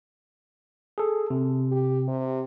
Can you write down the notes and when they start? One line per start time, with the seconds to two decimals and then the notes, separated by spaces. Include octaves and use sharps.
0.98 G#4 A4
1.30 C3
1.72 G4
2.08 C3